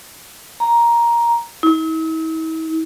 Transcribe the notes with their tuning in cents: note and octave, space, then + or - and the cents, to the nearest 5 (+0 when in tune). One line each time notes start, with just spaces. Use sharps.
A#5 +10
E4 -45